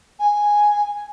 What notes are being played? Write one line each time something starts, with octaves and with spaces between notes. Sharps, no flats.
G#5